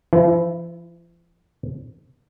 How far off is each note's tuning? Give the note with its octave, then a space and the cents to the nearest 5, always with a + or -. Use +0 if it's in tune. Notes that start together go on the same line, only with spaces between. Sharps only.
F3 -45 E4 +0